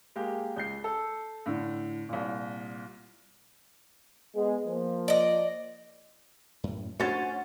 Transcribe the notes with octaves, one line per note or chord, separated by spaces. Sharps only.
G#3 A#3 G4
C#2 G6 C7
A4
A2 D3
C2 A#2
G#3 B3 G#4
F3 A#3
D5 D#5
F#2 A2
A3 C#4 D4 F#4 C5 A6